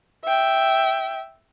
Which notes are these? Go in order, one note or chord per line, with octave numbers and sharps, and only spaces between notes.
E5 G5